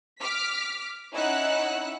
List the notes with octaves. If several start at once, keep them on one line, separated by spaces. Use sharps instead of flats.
D6 F6 B6
C#4 D#4 E4 F#5 E6 F#6